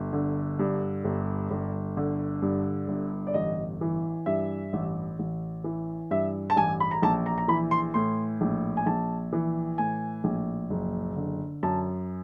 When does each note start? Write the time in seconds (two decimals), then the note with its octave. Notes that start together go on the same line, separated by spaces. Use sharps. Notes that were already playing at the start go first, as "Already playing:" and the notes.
Already playing: G1
0.13 D3
0.59 G2
1.05 G1
1.51 G1
1.97 D3
2.42 G2
2.88 G1
3.27 D5
3.34 A1 D#5
3.81 E3
4.26 G2 E5
4.73 A1
5.19 A1
5.64 E3
6.11 G2 E5
6.50 A5
6.56 A1 G#5
6.80 B5
6.91 A#5
7.02 A#1 A5
7.26 A#5
7.38 A#5
7.48 E3 B5
7.71 C6
7.94 A2 C6
8.41 A#1
8.77 G#5
8.86 A#1 A5
9.33 E3
9.78 A2 G#5
10.24 A#1
10.70 F#1
11.16 D3
11.63 F#2 A5